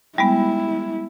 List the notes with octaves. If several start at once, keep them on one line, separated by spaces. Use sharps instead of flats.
G3 G#3 B3 E4